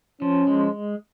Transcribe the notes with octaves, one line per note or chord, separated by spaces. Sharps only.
F3 C#4
G#3